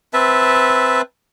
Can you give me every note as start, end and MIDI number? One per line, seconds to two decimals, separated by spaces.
0.13 1.02 60
0.13 1.02 71
0.13 1.02 76
0.13 1.02 81